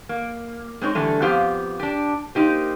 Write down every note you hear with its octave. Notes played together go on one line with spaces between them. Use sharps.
A#3
G#3 C4 D#4 C#5
D3 E3 G3 A3
F2 B3 G4 C5 F5
D4 G4
A#3 D#4 G4 C5